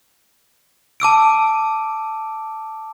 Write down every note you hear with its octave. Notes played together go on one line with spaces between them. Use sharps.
A5 D6 E6 D7